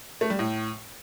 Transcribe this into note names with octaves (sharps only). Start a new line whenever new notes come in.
A3
G3
A2